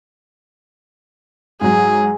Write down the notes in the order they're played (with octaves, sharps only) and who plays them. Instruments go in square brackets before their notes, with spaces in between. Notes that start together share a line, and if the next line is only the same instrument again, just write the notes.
[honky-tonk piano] G#2 F#3 [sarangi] G#4